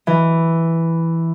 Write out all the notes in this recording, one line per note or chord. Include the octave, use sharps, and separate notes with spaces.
E3